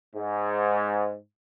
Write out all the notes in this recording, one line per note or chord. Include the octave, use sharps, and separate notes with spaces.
G#2